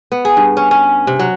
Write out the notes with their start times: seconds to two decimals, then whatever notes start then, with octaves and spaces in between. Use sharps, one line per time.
0.12 B3
0.25 G#4
0.37 G2
0.57 C#4
0.71 C#4
1.07 C3
1.19 F#3